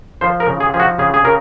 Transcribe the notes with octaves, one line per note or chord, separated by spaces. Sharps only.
F3 C5
A#4
C#3
G#4
F3 G#4
F#4
C#3 G#4
G#4
C#3 A#4